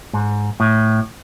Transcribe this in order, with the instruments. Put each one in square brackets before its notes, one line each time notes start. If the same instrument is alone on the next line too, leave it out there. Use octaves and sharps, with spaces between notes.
[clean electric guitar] G#2
A2